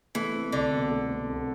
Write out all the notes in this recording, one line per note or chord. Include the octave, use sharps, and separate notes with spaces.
E3 A3
C4
C2 D3
B2
A3
C4
C2